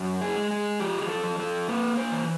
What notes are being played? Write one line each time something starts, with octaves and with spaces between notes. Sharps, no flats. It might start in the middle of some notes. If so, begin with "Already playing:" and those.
Already playing: F#2
G#4
G#3
G#4
F3 G4
G#4
A4
F3
A4
A#3 B4
C5
E3